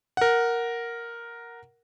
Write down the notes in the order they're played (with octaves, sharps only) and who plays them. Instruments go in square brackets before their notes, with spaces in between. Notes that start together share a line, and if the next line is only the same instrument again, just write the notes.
[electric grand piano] A#4 F#5